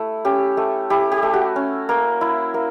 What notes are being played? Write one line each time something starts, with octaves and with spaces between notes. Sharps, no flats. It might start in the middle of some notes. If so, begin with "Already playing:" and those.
Already playing: A3 E4
C#4 G4
A3
E4 G4
G4
A3
F#4
C#4
A#3
E4
A#3